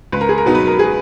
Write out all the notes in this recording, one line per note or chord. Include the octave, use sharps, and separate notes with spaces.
C#2 B4
A#4
G#4
A#4
B2 F#3 B3 D#4
B4
A#4
G#4